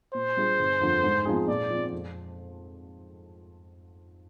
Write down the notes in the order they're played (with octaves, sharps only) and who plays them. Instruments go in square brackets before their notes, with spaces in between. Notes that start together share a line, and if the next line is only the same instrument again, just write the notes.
[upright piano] A#2 [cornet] C5
[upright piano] G3 D4 F4 G#4
G1
F2 D3 F3
G#2
F3 C4 D#4 G#4
[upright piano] A#2 [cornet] D5
[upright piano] F3 C4
F2